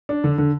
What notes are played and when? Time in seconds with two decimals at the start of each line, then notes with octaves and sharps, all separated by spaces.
0.09 D4
0.24 D3
0.38 D3